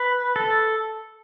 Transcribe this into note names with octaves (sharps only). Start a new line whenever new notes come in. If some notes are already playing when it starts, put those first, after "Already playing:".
Already playing: B4
A4